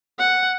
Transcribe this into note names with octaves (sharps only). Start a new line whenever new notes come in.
F#5